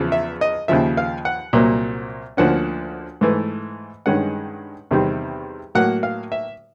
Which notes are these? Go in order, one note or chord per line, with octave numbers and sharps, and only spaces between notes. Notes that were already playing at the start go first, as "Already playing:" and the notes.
Already playing: E2 C#3 F3
E5
D#5
D#2 C#3 F3 E5
F5
F#5
C2 A#2 F#3 A#3
D2 D3 F3 A#3 C#4 F#5
G#2 E3 A3
G2 D#3 G#3 C#4 F#5
E2 C3 D#3 G3 C4
A2 F#3 A#3 F#5
F5
E5